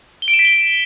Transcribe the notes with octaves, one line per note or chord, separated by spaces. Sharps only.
G7
D7
E7
B6
G7